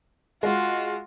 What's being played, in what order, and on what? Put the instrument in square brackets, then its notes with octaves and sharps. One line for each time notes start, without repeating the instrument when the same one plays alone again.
[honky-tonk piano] G#3 [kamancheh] F4 F#4